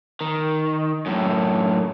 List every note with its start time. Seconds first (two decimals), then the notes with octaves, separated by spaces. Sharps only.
0.21 D#3
1.06 F#2 A2